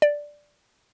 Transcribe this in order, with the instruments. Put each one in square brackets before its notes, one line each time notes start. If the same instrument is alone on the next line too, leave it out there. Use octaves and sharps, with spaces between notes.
[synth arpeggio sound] D5